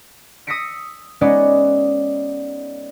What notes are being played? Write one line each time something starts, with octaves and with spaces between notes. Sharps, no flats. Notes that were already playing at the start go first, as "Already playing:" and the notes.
D#6 E6 A#6 B6 C#7 D7
G#3 B3 C#4 D#4 G#4 D5